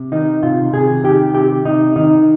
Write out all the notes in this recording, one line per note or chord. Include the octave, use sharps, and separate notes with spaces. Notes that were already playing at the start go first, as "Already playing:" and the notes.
Already playing: C3
D#3 D#4
C3 F4
C3 G#4
D#3 G4
C3 G4
C3 D#4
D#3 D#4